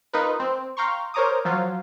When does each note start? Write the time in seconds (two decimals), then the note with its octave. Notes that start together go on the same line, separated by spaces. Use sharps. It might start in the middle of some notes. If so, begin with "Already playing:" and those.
0.13 D#4 F4 A#4 B4
0.40 C4
0.77 F5 G5 A#5 C6 C#6
1.14 A#4 C5 C#5 A#5 D6 D#6
1.45 F3 F#3 F4